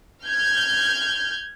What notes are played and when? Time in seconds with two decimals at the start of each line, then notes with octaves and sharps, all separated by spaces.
0.25 F6 G6 G#6